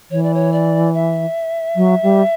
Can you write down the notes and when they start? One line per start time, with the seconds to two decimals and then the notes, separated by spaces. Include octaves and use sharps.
0.11 E3 C#5
0.23 D5
0.34 C#5
0.53 D5
0.94 E5
1.76 F#3
2.03 G3